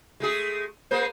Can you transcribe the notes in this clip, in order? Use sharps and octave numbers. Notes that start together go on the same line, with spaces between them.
G#3 A3 G#4
G#3 A#3 C5